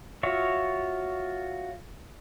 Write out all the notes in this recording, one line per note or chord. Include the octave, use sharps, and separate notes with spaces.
F4 F#4 C#5 E5